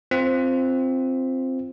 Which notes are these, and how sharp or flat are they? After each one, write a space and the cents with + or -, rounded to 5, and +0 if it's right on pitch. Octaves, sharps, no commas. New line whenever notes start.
C4 +0 F4 -10